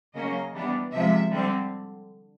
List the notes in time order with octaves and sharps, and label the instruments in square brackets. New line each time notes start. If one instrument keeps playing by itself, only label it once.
[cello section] C#3 F#3 A#3 C#4 D#5
E3 G3 B3 D4
C3 F3 G#3 E5
D3 G3 C4